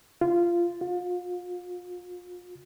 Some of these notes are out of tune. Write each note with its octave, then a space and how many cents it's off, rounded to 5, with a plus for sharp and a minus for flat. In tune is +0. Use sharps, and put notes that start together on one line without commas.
F4 -15
F4 +35